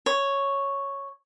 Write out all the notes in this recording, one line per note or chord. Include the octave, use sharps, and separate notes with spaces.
C#5